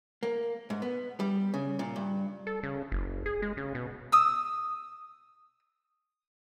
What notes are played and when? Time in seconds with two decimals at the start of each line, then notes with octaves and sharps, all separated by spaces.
0.23 A#3
0.70 G#2
0.82 B3
1.20 G3
1.54 C#3
1.79 A#2
1.96 G2
2.47 A4
2.63 C#3
2.92 F#1
3.26 G#4
3.42 G#3
3.57 C#3
3.75 B2
4.12 D#6 E6